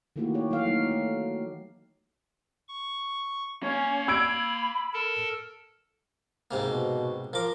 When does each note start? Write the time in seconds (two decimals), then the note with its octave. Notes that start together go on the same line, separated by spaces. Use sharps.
0.16 D#3 A3 A#3 E4 F#4 G4
0.34 G4 C#5
0.50 E3 F#3 A#3 A4 F5
0.65 F#3 A3 A#3 D#4
0.91 A3
2.68 C#6
3.63 A#3 C#4
4.08 B5 E6 G#6 D7
4.93 A4 A#4 A5
6.51 G#2 C3 A#3
6.62 B2
7.33 F3 A#4 D6